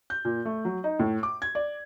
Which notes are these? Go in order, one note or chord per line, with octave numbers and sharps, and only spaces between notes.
G6
A#2
A3
F#3
D#4
A2
D6
G#6
D5